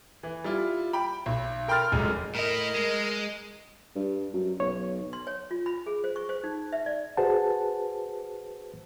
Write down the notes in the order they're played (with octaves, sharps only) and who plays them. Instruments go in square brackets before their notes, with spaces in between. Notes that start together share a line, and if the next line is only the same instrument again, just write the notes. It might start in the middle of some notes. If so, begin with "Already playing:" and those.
[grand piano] E3
G3 E4 F4
G5 B5
B1
A#4 G5 B5 C6 F6 A6
F1 F#2 G#3
[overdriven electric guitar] A2 E4 [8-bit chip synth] A#4 D#5
[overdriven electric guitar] G#3
[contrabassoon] G2
F#2
[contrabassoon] B1 [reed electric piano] C#5
[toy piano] C6
C#5
F4
B5
G#4
C5
C#6
C5
D#4
E5
D5
[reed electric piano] F#4 G#4 B4 C5 F#5 A5